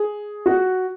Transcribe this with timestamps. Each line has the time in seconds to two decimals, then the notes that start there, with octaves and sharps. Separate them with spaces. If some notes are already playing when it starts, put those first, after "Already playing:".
Already playing: G#4
0.46 F#4